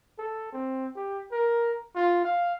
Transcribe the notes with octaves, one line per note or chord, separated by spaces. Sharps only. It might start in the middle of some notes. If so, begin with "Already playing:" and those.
A4
C4
G4
A#4
F4
F5